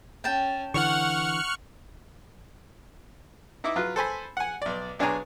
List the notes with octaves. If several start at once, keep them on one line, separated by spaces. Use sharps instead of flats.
C#4 G5 A5
D3 E3 F#5 C#6 F6 F#6
D#4 E4 D#5 E5 D6
F#3 F4 B4
A4 C5 G#5 B5
F#5 G#5
B1 D5
B1 D4 G#4 C#5 G#5 A#5